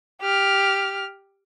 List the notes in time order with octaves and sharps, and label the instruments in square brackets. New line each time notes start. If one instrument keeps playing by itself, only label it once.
[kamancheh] G4 F6